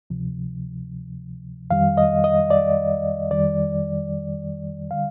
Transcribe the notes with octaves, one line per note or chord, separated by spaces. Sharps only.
D2 C3 F3
F2 D#3 G3 F5
D#5
D#5
D5
F2 D#3 G3 D5
D3 G3 F5